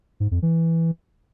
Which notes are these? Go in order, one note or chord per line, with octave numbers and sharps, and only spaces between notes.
G#2
F2
E3